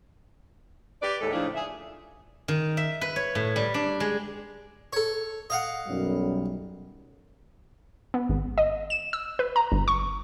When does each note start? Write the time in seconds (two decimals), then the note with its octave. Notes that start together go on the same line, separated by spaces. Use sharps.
1.02 G4 B4 D5
1.21 D#2 A2 G#3 A4
1.33 A2 C#3 F3 D4 D#4
1.55 G#4 E5
2.48 D#3
2.77 E5
3.01 B4
3.16 C#5
3.35 A2
3.56 G3
3.74 D4
4.00 G#3
4.93 A4 C#5
5.50 D#5 F5 F#5
5.87 B1 F#2 G3
8.14 B3
8.29 G#1
8.58 D#5
8.90 E7
9.13 E6
9.39 B4
9.56 A#5
9.72 G1
9.88 C#6